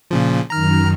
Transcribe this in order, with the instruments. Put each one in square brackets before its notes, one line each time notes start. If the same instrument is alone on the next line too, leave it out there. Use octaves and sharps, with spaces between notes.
[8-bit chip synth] A#2 C#3 F3
[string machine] F#2 D#3 [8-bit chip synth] A#5 F6